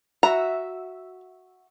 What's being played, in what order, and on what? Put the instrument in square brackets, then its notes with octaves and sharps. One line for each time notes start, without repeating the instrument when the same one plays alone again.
[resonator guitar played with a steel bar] F#4 E5 [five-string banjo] A#5